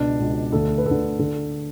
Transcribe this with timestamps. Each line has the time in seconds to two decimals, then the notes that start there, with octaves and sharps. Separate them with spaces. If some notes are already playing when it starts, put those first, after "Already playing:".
Already playing: C#2 B2 D4
0.20 C#2 B2
0.52 D2 D3 A4
0.78 B4
0.86 D2 A4
0.91 D3
1.19 D3